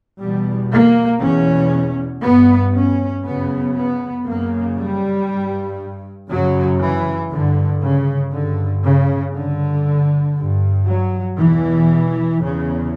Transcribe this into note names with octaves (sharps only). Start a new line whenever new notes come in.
E2 B2 G3
A#3
E2 B2 C#4
G2 B3
C#4
F#2 C#3 B3
B3
F#2 C#3 A#3
G3
G2
F#2 C#3 F#3
E3
G2 D3
C#3
G2 D3
C#3
G2 D3
G2
F#3
E2 B2 E3
E2 C#3